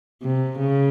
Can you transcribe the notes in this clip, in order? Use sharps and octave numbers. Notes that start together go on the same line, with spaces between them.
C3
C#3